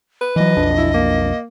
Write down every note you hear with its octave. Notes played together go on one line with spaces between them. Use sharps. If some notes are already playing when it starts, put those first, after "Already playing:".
B4
E3 F#3 D#5
B1 F2 D4
E4
A#3